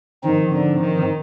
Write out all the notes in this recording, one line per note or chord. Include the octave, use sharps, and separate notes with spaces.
G#2 D#3 F3 C4 D#4
D3
D#3